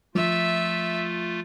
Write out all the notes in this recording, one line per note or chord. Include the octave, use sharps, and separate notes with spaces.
F3 A3 F4 E5